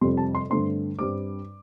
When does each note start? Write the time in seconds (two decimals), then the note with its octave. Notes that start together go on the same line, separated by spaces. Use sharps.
0.01 F2 C3 G3 C4 C6
0.17 A5
0.35 C6
0.50 G2 D3 A3 C4 C6
0.99 G2 G3 C4 D6